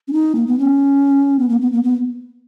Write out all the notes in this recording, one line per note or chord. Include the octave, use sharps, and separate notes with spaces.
C#4
D#4
A#3
B3
C#4
B3
A#3
B3
A#3
B3